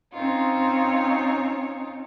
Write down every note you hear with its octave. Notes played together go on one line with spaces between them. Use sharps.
C4 C#4 D#4 F4 C#5